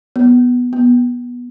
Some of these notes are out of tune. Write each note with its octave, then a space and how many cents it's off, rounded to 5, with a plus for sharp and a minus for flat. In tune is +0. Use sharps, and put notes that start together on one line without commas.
B3 -5
B3 -20